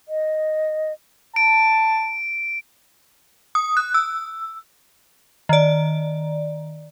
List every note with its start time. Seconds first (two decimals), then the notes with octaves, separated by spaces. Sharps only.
0.08 D#5
1.36 A5 D7
3.55 D#6
3.77 F#6
3.94 E6
5.49 D#3 D5